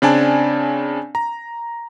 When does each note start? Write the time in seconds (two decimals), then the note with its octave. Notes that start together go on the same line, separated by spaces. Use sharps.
0.02 C#3 C4 D4 D5 G#5 A5
1.15 A#5